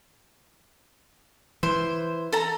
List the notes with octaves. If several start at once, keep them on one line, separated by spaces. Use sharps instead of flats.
E3 C5
A4 A#5